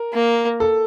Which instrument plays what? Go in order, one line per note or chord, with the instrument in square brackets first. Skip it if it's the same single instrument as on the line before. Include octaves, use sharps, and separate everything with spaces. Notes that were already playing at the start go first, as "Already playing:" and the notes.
Already playing: [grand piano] A#4
[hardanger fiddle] A#3
[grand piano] A4